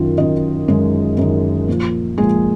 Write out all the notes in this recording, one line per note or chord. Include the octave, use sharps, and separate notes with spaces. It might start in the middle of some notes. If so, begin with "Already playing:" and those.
Already playing: F#2 D#3 F4
F#2 D#3 D#4 D#5
F#2 D#3 G#3 G#4
F#2 D#3
A#2 F3
A#2 F3 G#3 G#4